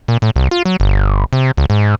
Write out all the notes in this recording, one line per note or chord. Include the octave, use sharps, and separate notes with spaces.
A#2
A2
C2
F4
F#3
G1
C3
C#2
G#2